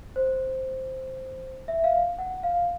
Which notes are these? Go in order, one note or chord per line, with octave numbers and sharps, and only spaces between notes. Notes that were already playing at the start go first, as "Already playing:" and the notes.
C5
E5
F5
F#5
F5